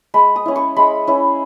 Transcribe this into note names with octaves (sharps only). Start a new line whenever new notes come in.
G#3 B5
D#6
C#4 E4
C#6
G#3 B5
C#4 E4